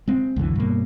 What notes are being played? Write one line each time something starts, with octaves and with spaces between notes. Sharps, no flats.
G#3 C4
C2 F#2 D3 E3
G2 B2 A#3